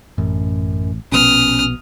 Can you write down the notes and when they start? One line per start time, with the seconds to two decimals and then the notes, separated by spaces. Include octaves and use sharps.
0.18 A1 F#2
1.12 A#1 B2 B3 C#4 D#6 F6